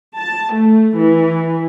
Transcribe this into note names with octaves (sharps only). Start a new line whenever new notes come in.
A5
A3
E3